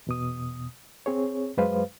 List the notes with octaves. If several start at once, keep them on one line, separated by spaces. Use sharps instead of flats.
E2 B2 D#6
C4 G#4 C#5
F#2 F#3 G#3 B4 C5 F5